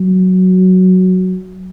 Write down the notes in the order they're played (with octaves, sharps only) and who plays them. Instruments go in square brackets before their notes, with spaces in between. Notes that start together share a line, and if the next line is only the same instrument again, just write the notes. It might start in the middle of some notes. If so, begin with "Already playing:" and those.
Already playing: [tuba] F#3